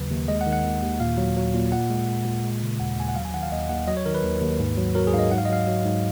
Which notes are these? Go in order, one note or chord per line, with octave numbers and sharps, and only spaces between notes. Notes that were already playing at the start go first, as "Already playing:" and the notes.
Already playing: D#2 C#3 F#3 B4
D#2
G#3 D#5
F#5
D#3
F#5
D#2
D#2
A#2 F5
F#3
F#3
A#2
A#2 F#5
G#3
G#3
A#2
G#3
C#3
D#2 F#5
D#2 G#5
F#5
F#3 F5
G#5
D#3 F#5
F5
D#2 D#5
D#2 F#5
F#3 D#5
C#5
D#3 A#4
B4
D#2
D#2
G#2
F#3
F#3 A#4
G#4
G#2 F5
D#5
G#2 F#5
F5
D#5
F#3 F5
F#3
G#2